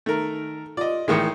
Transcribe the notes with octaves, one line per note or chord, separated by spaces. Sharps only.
D#3 A3 A#4
F4 D5 D#5
A2 D#3 E3 G#3 G5 C#7